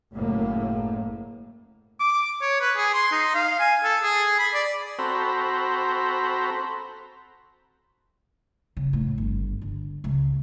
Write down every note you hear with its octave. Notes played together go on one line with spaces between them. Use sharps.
F#1 A2 A#3
D6
C#5
B4
G#4
C6
D#4
F5
G#5
A4
G#4
B5
D5
C4 F#4 A4 C5 A#5 B5
C#3
A2
G1
D3
C#2